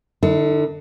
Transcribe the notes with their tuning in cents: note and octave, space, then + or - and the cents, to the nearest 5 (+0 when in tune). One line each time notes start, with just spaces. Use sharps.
D3 +25 E4 -35